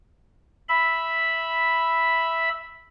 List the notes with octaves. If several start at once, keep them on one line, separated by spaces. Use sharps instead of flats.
E5 B5